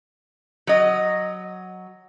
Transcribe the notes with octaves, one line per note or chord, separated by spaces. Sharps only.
F#3 D#5